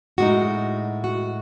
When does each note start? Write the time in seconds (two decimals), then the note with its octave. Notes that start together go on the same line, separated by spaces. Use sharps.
0.18 A2 G#3 D#4 F#4
1.04 F#4